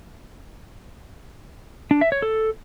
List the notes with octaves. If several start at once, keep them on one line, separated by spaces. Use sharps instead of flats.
D4
E5
C#5
A4